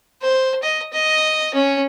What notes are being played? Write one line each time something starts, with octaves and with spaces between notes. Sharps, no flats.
C5
D#5
D#5
C#4